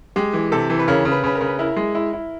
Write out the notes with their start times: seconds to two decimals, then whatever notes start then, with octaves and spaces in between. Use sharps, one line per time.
0.16 G#3 G4
0.33 E3
0.52 C3 A4
0.70 E3
0.79 B4
0.88 C#3 A#4
1.05 C#3
1.12 B4
1.24 C#3 B4
1.35 A#4
1.41 C#3
1.47 B4
1.59 E4 A#4
1.77 G#3
1.95 E4
2.13 E4